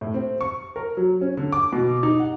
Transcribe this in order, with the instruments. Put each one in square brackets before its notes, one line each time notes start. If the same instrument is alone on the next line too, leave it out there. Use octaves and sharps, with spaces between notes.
[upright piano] A2
C4
C#6
A#4
F#3
C#4
D3
D6
B2
D#4
F#5